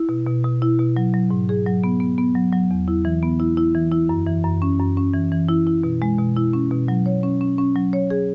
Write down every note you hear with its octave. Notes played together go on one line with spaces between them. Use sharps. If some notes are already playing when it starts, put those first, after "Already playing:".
Already playing: E4
B2
B2
B2
E4
B2
F#3
F#3
G#2
G#4
F#3
B3
B3
B3
F#3
F#3
E2
E4
E3
B3
E4
E4
E3
E4
F#2
E3
F#2
C#4
F#2
C#4
E3
E3
E4
E4
B2
G#3
B2
E4
C#4
B2
F#3
C#5
C#4
C#4
C#4
F#3
C#5
G#4